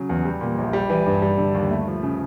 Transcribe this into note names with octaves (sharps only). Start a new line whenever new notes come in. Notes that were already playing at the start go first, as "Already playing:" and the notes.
Already playing: C#3 F#3
E2
G3
A#2
A#1
G3
E3
G2
G3
D3
D#2
A3
F3
C#3